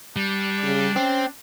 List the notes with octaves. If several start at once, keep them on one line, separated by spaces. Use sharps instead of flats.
G3 D4
C#3
C4 C#4